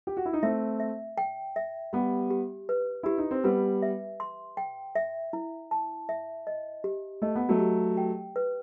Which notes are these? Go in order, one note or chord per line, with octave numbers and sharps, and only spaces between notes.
G4
F#4
E4
D#4
A3 C4 E5
E5
G5
E5
G3 B3 G4
G4
B4
E4 G4
D#4
C4
G3 B3 B4
E5
C6
G5
E5
E4
A5
E5
D#5
G4
A3 D#5
B3
F#3 A3
G4
G5
B4